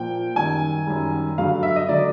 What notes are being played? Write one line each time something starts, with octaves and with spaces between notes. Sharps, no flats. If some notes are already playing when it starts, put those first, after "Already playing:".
Already playing: A#2 F3 G5
F#2 D#3 G3 G#5
F#2 D#3 G3
G2 D3 F#3 F5
E5
D#5
D3 F#3 D5